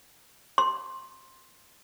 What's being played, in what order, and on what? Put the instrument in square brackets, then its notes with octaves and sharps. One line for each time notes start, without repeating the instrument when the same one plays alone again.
[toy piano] C6